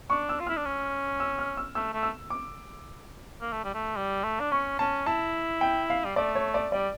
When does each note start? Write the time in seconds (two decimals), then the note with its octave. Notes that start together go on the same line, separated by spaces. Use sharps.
0.10 D4 C#6
0.29 E6
0.40 F4
0.47 E4 F6
0.57 D4
0.65 C#4
1.20 E6
1.39 F6
1.57 E6
1.75 A3 E6
1.94 A3
2.03 E6
2.30 D6
3.41 A#3
3.52 A3
3.64 G3
3.74 A3
3.96 G3
4.24 A3
4.40 D4
4.51 C#4 C#6
4.79 C#4 A5
5.06 E4 A5
5.61 G5
5.90 F5
6.05 G3
6.16 A3 D5
6.35 C#5
6.54 D5
6.72 G3 D5